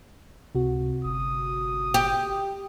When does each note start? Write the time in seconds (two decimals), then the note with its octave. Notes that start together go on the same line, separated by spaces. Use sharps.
0.55 C#2 C3 F#4
1.05 G1 D#6
1.94 G4